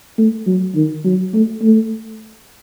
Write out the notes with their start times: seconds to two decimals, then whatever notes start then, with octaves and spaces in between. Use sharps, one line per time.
0.18 A3
0.46 F#3
0.75 D#3
1.04 F#3
1.34 A3
1.62 A3